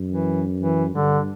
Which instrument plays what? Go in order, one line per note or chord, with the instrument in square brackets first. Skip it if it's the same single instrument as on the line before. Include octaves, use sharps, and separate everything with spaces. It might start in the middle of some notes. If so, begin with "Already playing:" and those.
Already playing: [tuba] F#2
[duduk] E3
E3
[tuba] G2 [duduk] D3